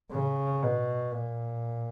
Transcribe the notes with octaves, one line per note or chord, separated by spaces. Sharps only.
C#3
B2
A#2